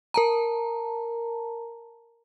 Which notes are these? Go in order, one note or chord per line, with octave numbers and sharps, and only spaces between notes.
A#4 A5 A#5